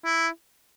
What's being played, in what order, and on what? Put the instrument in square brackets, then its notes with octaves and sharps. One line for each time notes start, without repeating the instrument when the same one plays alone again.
[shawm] E4